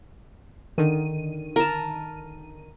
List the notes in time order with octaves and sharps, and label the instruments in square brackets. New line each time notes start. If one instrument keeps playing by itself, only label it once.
[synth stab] D3 D#3 D#7
[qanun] A#4 A5